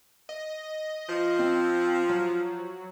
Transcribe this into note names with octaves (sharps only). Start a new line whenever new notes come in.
D#5
F3
C4
F#3